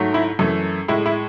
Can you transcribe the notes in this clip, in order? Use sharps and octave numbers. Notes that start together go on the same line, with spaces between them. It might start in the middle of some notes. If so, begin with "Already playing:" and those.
Already playing: G#2 F#3 A3
E4
F#2 E3 A3
A2 G#3 E4
E4